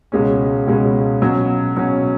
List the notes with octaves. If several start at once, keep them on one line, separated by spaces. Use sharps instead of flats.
C#2 B2 G#3 C#4
C#2 B2 G#3 C#4
B2 F#3 C#4
B2 F#3 C#4